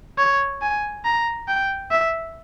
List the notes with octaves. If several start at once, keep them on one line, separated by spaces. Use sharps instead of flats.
C#5
G#5
A#5
G5
E5